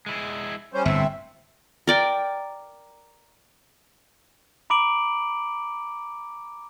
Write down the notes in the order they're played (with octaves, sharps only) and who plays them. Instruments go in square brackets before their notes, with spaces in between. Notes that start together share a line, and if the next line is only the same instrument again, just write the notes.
[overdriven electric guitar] G#3 E4
[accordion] G3 C#4 C5
[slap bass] G1 [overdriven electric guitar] A2 [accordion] C4 E5
[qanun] A#4 D5 G5
[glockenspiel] A#5 B5 D6 D7 F#7